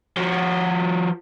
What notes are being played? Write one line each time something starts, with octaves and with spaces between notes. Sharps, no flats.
F3 F#4